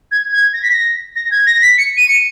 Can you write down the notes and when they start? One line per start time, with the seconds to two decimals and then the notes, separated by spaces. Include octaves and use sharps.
0.12 G#6
0.33 G#6
0.53 A#6
0.63 B6
0.71 A#6
1.16 A#6
1.31 G#6
1.47 A#6
1.62 B6
1.78 C#7
1.97 D#7
2.09 C#7